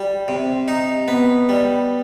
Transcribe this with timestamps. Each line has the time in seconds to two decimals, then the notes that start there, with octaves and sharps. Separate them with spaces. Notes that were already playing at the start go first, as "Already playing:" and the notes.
Already playing: G3
0.28 C3
0.68 D#4
1.08 B3
1.49 G3